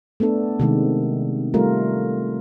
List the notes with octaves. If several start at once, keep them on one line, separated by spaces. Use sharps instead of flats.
A3 B3 D4 A4
C3 D#3 G#3
G3 A3 F4 A#4